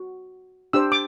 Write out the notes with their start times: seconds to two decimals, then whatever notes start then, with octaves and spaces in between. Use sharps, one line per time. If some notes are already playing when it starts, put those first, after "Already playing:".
Already playing: F#4
0.73 D4 G4 C5 E6
0.92 D6